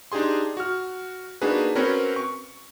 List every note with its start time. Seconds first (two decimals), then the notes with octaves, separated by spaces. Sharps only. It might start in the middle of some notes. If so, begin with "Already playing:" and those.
0.12 D4 D#4 G4 G#4 C6
0.57 F#4 F6
1.41 A#3 D4 D#4 F#4 G#4 B4
1.75 C4 C#4 F#4 A#4 B4 C#5
2.16 C#6